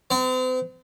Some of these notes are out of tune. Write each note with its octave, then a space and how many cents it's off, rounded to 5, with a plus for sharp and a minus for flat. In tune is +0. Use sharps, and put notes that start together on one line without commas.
C4 -40